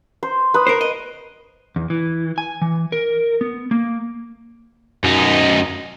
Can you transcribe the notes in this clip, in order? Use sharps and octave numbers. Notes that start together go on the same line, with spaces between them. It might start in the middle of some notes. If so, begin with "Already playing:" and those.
C5
B4 D#6
A#4 C5
D#5
E2
E3
G#5
E3
A#4
B3
A#3
F#2 D#4